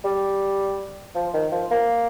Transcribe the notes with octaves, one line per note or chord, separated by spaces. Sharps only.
G3
F3
D#3
F3
A#3